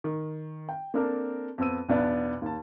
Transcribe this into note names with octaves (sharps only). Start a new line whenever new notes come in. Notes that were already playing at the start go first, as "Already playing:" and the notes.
D#3
G5
A#3 C4 D4 A4 A#4
F2 B3 C5 E6 D#7
B1 E2 B3 D4 B4 D5
D#2 A5